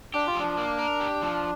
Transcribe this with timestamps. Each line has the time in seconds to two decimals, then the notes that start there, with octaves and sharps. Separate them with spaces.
0.14 D4 G4
0.27 F4
0.36 F3 D4
0.57 A#3
0.79 A#4
1.00 G4
1.22 F3